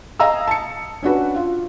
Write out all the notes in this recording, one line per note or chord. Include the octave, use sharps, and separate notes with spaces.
D#5 F5 G#5 A#5 D#6 E6
A5 C#7
C#4 D4 F#4 B4
F4